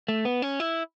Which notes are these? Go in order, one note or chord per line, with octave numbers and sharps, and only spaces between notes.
A3
B3
C#4
E4